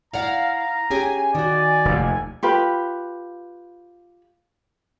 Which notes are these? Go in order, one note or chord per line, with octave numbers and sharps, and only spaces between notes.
E4 D5 F5 F#5 A#5
C#4 G4 G#4 G#5
D#3 F#4 D5
F1 D#2
F4 G4 B4 B5